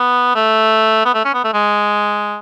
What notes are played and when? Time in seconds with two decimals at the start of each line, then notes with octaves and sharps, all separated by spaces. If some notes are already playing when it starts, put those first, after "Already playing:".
Already playing: B3
0.35 A3
1.05 B3
1.14 A3
1.25 C#4
1.34 B3
1.44 A3
1.54 G#3